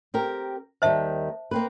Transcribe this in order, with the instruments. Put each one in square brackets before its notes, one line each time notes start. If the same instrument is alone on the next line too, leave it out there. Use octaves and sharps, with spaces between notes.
[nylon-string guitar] C4 G4 A#4
[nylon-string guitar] D#2 D#3 G3 [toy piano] C5 E5 A5
[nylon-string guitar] A#3 C4 B4